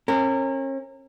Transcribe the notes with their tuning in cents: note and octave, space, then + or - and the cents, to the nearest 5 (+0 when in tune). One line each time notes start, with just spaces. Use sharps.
C#4 -40 A#4 -30